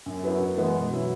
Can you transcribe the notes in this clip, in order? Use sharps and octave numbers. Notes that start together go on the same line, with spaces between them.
F#2
F#3 B3 E4
F#2
E3 G#3 B3
B2
F#3 C#4 E4